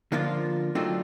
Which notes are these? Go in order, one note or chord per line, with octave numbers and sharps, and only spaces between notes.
D3 F3 A#3 D4 F4
F#3 A3 C4 D4 D#4 F4